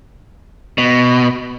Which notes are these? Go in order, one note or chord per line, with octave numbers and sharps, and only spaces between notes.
B2